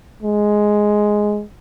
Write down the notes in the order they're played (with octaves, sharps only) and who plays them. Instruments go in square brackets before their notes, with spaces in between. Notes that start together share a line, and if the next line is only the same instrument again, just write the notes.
[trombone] G#3